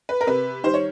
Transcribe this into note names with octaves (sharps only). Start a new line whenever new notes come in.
B4
A#4
C3 B4
D#3 G3 C5
C#5